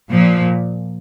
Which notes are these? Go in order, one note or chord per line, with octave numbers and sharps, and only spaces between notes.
A#2 F3